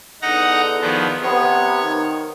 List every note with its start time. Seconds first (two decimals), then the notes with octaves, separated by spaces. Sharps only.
0.22 E2 D3 D#4 F#5 A#5
0.81 D#3 F3 B3
1.22 C3 B3 C#5
1.82 D#3